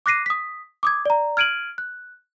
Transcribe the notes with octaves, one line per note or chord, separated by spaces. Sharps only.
D6 F#6 A#6 C7 D#7
D#6 B6
D6 D#6 G#6
D5 A#5
F6 G#6 D7 D#7 F#7
F#6